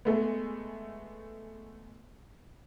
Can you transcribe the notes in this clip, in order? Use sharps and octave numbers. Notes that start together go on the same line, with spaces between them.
G#3 A3 B3